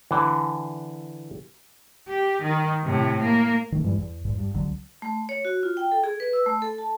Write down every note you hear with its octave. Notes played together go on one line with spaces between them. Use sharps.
D3 E3
G4
D#3
A2 C3
A#3
D#3 A3
G2 E3 G3 G#3
E2
E2 G#2
G2
C#2 D3 F#3
A3
C#5
F#4
F4
G5
A4
G#4
B4
E6
A3
A4
A5